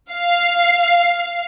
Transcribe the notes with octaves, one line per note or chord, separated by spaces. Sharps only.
F5